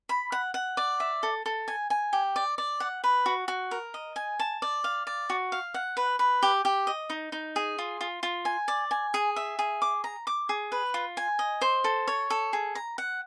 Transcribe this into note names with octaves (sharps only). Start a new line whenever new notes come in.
B5
F#5
F#5
D5
E5
A4
A4
G#5
G#5
G4
D5
D5
F#5
B4
F#4
F#4
A#4
D#5
G#5
A5
D5
F5
D5
F#4
F5
F#5
B4
B4
G4
G4
D#5
D#4
D#4
G#4
F4
F4
F4
G#5
D5
G#5
G#4
E5
G#4
D6
A#5
D6
G#4
B4
F4
G#5
D#5
C5
A4
C#5
A4
G#4
A#5
F#5